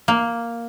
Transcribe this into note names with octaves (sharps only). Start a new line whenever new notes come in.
A#3